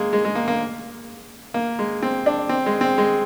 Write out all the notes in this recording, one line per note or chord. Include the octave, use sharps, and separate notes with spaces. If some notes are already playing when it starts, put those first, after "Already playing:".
Already playing: G#3 A#3
G#3
G#3
A#3
A#3
A#3
G#3
C4
D4
C4
G#3
C4
G#3